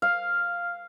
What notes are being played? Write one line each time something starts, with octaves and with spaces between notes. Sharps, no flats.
F5